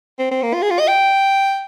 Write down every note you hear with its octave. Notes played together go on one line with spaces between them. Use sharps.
C4
C4
A#3
F4
G#4
F4
D#5
G5